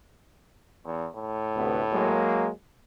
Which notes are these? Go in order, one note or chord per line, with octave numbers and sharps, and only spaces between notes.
E2
A2
D2 C3 B3
F#3 G#3 A#3